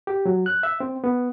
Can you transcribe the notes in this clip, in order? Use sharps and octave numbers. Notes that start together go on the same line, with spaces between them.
G4
F#3
F#6
E5
C4
B3